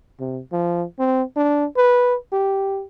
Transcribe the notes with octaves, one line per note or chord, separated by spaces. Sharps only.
C3
F3
C4
D4
B4
G4